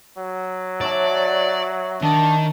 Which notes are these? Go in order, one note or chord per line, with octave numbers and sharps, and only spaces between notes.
F#3
C#5 D5 E5 A5
D#3 D4